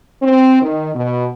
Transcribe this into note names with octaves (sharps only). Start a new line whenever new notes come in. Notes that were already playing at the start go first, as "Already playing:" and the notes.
C4
D#3
B2